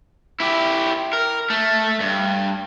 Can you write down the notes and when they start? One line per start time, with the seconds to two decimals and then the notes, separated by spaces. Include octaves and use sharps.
0.40 E4 G4
1.13 A#4
1.50 A3
2.01 G2